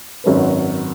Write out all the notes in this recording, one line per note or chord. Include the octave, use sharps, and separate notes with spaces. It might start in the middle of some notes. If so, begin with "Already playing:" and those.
G#1 F#2 F#3 C#4 B4